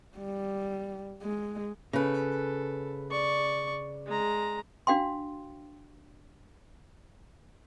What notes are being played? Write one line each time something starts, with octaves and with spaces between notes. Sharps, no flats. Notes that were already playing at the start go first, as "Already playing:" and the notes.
G3
G#3
C#3 A4 B4
D5 C#6
G#3 A#5
D4 F#4 F5 G5 C6